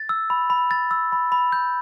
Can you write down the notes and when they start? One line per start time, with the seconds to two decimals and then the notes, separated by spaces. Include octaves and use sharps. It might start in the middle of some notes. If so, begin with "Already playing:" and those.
Already playing: A6
0.09 E6
0.30 B5
0.50 B5
0.71 A6
0.91 E6
1.12 B5
1.32 B5
1.52 G6